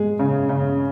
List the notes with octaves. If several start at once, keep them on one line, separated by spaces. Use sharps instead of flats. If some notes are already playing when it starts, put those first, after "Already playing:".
Already playing: G#3 G#4
C#3
C#3